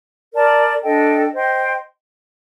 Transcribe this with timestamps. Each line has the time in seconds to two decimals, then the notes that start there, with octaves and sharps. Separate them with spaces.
0.34 A#4 D5 A5
0.84 D4 A4 D#5 G5
1.34 C5 D#5 G5 C6